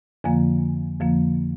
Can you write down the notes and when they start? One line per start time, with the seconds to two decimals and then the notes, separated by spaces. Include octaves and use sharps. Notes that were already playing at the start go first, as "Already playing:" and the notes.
0.24 F2 D3 F3 A#3 G#5
1.00 F2 D3 F3 A#3